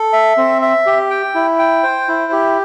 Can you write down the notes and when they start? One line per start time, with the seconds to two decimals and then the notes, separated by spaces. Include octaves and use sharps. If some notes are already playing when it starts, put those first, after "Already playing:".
Already playing: A4
0.13 E5
0.37 C4
0.62 E5
0.86 G4
1.11 G5
1.35 E4
1.59 G5
1.83 C5
2.08 E4
2.32 G4